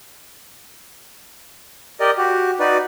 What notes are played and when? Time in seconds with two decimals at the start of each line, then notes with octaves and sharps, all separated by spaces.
2.00 G4 A#4 D5 D#5
2.18 F#4 G4
2.60 D#4 F#4 B4 D5